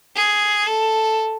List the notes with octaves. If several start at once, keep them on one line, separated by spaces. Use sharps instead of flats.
G#4
A4